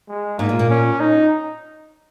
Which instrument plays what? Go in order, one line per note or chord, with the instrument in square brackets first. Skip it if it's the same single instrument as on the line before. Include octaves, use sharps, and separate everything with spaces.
[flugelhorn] G#3
[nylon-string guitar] G#2 [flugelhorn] A#3
[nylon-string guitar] A#2
A#2
[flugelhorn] C#4
D#4